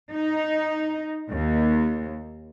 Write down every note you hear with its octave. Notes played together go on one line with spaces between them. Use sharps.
D#4
D#2